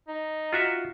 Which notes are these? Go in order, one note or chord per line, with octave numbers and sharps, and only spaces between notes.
D#4
F4 F#4 E5